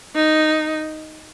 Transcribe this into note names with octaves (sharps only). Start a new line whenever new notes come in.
D#4